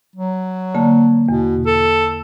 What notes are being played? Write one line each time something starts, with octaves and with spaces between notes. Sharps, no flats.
F#3
D3 A#3 A5
E2 B2
A4